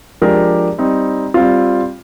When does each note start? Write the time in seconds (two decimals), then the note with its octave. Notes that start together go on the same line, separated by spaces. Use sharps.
0.22 F3 G#3 D4 G4 A#4
0.79 G3 C4 D#4
1.34 G3 C4 F4